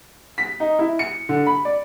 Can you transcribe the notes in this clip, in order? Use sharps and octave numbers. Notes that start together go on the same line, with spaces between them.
B6
D#4
E4
C#7
D3
B5
D5